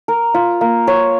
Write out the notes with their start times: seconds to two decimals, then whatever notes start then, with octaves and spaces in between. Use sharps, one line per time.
0.08 A#4
0.34 F4
0.61 A#3
0.87 C#5